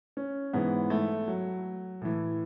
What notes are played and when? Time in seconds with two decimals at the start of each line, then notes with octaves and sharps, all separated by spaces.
0.17 C#4
0.53 G#2 E3 B3
0.90 A3
1.28 F#3
2.02 A2 E3